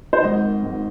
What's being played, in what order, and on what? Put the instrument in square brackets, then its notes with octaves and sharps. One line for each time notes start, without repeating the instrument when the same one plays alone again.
[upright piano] C5
G#1 G#2 D#3 D#5
G#1 G#2 D#3